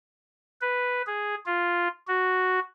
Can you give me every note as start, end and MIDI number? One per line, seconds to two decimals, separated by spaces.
0.61 1.02 71
1.07 1.35 68
1.46 1.88 65
2.08 2.59 66